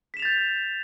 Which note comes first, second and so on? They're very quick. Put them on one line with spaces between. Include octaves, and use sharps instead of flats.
B6 E7 F7 A6 G6